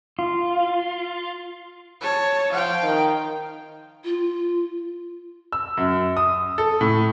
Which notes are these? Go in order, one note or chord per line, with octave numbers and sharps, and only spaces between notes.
F4
C#5 A5
F3 F5 G5
D#3
F4
E6
F#2
D#6
A4
A2